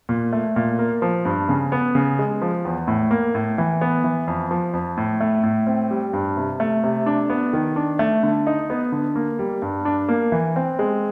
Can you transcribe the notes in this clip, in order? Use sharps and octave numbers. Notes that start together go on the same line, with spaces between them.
A#2
A3
A#2
A#3
F3
G2
C#3
B3
C#3
G#3
F3
E2
A2
A#3
A2
E3
B3
E3
F2
F3
F2
A2
A3
A2
C4
G3
G2
C3
A3
C3
D4
B3
D#3
D4
A3
D3
D#4
B3
D3
A#3
G3
G2
D4
A#3
E3
C4
G#3